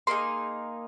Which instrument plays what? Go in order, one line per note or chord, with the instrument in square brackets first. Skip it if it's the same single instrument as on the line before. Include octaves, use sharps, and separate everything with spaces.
[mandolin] A#3 D#4 G#4 C6